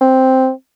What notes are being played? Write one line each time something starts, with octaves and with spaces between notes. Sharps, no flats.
C4